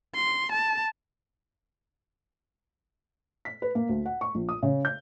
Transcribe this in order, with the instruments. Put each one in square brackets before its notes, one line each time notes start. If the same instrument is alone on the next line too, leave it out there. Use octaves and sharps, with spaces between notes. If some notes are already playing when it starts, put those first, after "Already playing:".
[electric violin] C6
A5
[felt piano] B6
B4
A#3
D2
F#5
C#6
A#1
D#6
C#3
G6